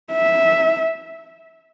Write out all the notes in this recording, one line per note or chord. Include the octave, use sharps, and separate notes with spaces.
E5